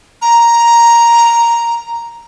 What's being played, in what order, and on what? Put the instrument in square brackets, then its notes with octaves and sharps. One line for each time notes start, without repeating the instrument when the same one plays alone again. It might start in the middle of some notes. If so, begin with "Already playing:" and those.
[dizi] A#5